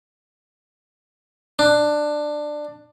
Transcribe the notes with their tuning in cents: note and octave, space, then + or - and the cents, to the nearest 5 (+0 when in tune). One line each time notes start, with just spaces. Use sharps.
D4 +15